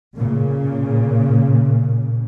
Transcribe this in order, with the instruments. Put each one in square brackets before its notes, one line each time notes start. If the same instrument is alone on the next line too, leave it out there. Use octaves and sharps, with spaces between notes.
[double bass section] A#2 C#3